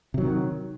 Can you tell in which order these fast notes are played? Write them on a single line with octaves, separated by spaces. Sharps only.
C3 F#3 D#3